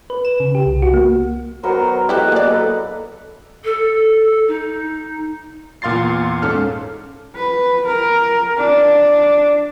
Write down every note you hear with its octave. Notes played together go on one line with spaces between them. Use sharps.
B4
E7
C#3
G4
C2
F#4
A#3
D#3 F#3 B3 F#4 A#4 C5
G#2 E4 G4 A4 D#5 F#6
A#3 D5
A2 A4 B4
A4
D#4
E2 A#2 F5 C6 A6 C7
G#2 C#4 A4 F6
B4
A#4
D4